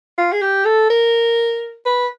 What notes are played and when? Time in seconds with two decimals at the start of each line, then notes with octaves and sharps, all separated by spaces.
0.18 F4
0.32 G#4
0.42 G4
0.65 A4
0.90 A#4
1.86 B4